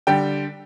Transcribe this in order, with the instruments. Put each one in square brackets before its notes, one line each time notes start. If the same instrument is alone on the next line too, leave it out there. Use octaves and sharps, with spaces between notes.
[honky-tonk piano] D3 G3 G5